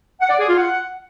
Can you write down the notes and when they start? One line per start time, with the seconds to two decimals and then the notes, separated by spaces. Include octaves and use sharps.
0.20 F#5
0.30 D5
0.39 G#4
0.48 F4
0.58 F#5